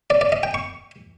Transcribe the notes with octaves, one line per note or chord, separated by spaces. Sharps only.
D5
D5
D#5
G5
C#6